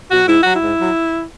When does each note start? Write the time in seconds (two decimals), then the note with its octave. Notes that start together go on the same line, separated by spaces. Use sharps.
0.11 B2 F#3 F#4
0.27 G#2 E4
0.41 F#3 F#4
0.55 E4
0.61 G#2
0.79 F#3